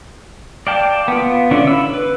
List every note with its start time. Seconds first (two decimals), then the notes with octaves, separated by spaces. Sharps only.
0.67 D5 F5 G5 A5
1.08 B3 F4
1.51 D3 C#4 D4 E4 F4
1.67 B5 E6
1.93 B4